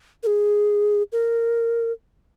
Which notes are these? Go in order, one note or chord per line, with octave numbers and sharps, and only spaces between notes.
A#4
G#4
A#4